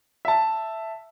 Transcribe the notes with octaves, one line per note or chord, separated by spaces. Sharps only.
E5 A5